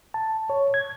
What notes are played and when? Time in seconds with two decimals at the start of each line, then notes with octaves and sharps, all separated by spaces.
0.14 A5
0.50 C#5
0.74 G#6